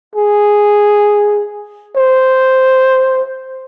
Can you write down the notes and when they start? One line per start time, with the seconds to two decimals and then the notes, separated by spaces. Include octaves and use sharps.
0.15 G#4
1.96 C5